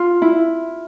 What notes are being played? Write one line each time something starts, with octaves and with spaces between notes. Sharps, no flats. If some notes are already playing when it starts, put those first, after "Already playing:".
Already playing: F4
E4